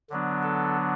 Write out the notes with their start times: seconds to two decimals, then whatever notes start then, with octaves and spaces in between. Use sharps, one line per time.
0.10 D3 F#3 B3 D4
0.43 A4